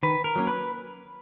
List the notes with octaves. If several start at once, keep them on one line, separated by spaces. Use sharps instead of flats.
D#3 B4
A#4
F#3 A#3 C#4
B4